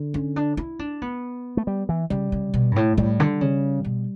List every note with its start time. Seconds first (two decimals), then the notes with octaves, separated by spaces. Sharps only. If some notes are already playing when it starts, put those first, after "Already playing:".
Already playing: D3
0.14 C#4
0.36 D4
0.57 E4
0.79 D4
1.02 B3
1.57 A3
1.67 G3
1.89 E3
2.10 C#3 G3
2.32 C#3
2.54 B2
2.71 G2
2.76 A2
2.97 A2 G3
3.20 D3
3.41 C#3
3.84 B2